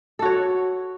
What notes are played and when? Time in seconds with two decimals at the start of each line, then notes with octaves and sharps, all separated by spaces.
0.19 A4
0.22 F#4
0.25 C#5